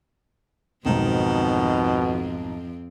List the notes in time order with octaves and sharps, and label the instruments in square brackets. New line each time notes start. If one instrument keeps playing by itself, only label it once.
[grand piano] B1 G#2 [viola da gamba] F2 C4 [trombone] B2 [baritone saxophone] D#3